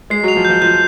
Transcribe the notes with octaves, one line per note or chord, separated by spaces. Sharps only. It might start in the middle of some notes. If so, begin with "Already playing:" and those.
G#3 C7
F#3
F7
F3
G6
F3
F3 G6